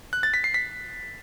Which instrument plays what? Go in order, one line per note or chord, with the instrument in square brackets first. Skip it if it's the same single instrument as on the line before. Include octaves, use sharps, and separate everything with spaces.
[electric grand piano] F#6
A6
B6
C7
B6